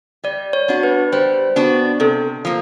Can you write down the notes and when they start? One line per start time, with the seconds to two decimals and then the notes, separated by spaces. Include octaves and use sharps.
0.24 G3 D5
0.53 C#5
0.68 B3 D4 F#4
0.83 B4
1.12 G3 C5
1.56 B3 D4 F#4
2.00 C3 A4
2.45 F3 A#3